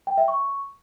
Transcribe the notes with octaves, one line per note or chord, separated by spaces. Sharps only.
G5
E5
C#6